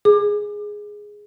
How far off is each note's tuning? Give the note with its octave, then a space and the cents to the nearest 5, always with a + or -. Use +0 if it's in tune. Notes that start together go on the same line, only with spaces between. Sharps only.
G#4 +0 D6 +30